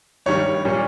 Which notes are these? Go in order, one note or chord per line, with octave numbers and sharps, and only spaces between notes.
G2 D#3 G3 C#5
A#2 G3 C#4